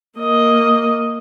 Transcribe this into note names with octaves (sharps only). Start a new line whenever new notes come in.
A#3 D#5